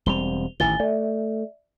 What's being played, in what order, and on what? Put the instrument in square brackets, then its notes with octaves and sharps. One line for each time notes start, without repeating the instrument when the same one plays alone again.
[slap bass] E1 G3 C4 [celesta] F7 G7
[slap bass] A1 D#3 E3 [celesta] G#5 A6 G7
[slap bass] A3 [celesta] D5 E5